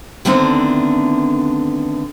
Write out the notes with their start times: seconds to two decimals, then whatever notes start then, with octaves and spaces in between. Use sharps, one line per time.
0.25 D3 D#3 A3 B3 C4 D4